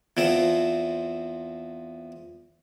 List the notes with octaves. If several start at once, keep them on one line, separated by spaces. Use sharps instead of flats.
E2 F3 C4